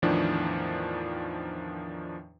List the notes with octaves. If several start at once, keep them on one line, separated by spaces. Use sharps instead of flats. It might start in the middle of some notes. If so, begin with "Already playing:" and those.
E2 A2 D#3 F3 D4